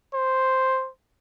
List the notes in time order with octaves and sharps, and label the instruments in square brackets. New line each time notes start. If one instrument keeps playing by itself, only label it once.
[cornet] C5